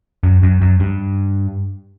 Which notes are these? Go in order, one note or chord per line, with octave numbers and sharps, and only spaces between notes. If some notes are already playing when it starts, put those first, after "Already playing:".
F#2
F#2
F#2
G2